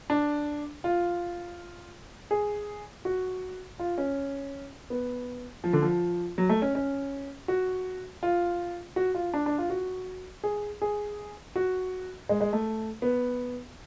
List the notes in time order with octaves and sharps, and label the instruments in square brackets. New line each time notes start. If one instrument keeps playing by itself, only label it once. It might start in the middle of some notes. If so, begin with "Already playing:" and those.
[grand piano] D4
F4
G#4
F#4
F4
C#4
B3
F3
D3
F3
F#3
A3
C#4
C#4
F#4
F4
F#4
F4
D4
D4
F4
F#4
G#4
G#4
F#4
G#3
G#3
A3
B3